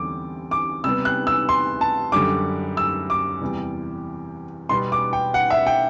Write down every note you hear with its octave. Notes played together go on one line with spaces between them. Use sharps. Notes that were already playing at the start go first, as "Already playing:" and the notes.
Already playing: E2 D3 G3 C4 D6
D6
C3 G3 B3 E6
F#6
E6
C6
A5
F#2 D3 G3 D6
E6
D6
E2 C3 E3 G3
B2 G3 B3 C6
D6
G5
F#5
E5
G5